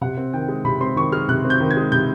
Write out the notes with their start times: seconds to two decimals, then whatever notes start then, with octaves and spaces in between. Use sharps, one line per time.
0.01 C3 F#5
0.17 C4
0.33 D#3 G5
0.49 G#3
0.65 C3 B5
0.81 C4 C6
0.96 D#3 C#6
1.12 G#3 F6
1.29 C3 F#6
1.45 C4
1.50 G6
1.60 D#3
1.71 G#6
1.77 G#3
1.92 C3 G6